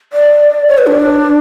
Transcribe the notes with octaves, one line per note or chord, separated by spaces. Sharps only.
D5
C#5
B4
D4